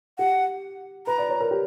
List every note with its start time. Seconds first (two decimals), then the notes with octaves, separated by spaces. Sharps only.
0.18 G4 F#5
1.07 B4 A#5
1.18 D5
1.30 C#5
1.40 A#4
1.51 G4